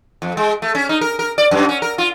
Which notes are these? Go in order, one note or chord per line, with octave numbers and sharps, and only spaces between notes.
F2
G#3
A3
C#4
D#4
A#4
A#4
D5
F#2
C#4
A#4
F4